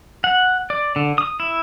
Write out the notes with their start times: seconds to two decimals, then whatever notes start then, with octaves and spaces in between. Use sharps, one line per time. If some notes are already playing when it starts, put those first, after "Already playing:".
0.24 F#5
0.70 D5
0.96 D3
1.18 D#6
1.40 E4